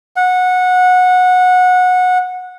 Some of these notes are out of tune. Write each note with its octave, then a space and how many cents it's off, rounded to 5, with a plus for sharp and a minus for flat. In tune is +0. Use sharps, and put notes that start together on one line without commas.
F#5 -20